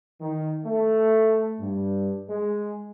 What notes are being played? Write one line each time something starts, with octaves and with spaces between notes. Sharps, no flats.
D#3
A3
G2
G#3